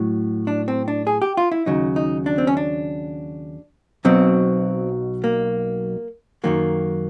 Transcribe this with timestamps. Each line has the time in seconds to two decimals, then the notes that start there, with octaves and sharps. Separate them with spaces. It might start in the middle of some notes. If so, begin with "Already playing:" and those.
Already playing: A2 F#3
0.47 D4
0.68 C4
0.88 D4
1.07 G#4
1.22 G4
1.37 F4
1.52 E4
1.66 D#2 C#3 F#3 D#4
1.96 D#4
2.26 D4
2.38 C4
2.47 C#4
2.57 D4
4.05 B1 B2 F#3 C4
5.24 A#3
6.44 F#2 D#3 F#3 A#3